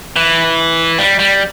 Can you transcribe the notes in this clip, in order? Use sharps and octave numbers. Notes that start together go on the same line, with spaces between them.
E3
G3
G3